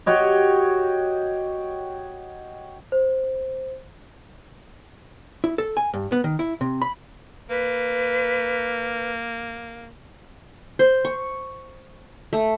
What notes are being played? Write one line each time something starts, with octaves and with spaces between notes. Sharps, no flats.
F#4 G4 C#5 D#5
C5
E4
A4
G#5
G2
B3
D#3
E4
C3
B5
A#3 B4
C5
C#6
A3